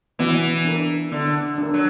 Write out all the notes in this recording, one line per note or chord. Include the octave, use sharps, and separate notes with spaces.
E3 B3
D4 A#4
D3 B3
D4
A#4
F#3